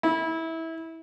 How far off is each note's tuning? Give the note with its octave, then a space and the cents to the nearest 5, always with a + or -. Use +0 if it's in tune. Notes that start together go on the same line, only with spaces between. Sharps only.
E4 -20